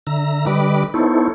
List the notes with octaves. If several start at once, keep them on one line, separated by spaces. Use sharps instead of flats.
D3 E5 A#5
D3 G3 B4 D#5 B5 D6
B3 D#4 E4 A4 C5 C#5